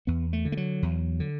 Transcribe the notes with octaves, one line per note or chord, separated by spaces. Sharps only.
E2 B3
A3
D3
A3
F#3
E2
D3